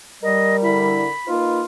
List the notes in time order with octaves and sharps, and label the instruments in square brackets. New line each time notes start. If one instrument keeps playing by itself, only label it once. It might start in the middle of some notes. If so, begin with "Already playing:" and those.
[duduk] G3 [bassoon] A#4 [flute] D#5
[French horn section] D3 E4 [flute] B5
[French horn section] A#3 D#4 B4 [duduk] F4